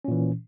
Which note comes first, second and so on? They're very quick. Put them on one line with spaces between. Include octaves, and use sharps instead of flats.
C#4 A#2 E3